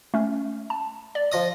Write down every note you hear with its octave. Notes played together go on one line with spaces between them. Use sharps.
A3 C#4
A5
D5
F3 D#5 D#6